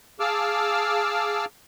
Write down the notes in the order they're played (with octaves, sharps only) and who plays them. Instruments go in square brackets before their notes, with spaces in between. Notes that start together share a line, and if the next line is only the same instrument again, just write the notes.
[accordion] G#4 F5 A5 D6 E6 F6